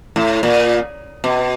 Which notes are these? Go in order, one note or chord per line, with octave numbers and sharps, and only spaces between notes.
A2
A#2
B2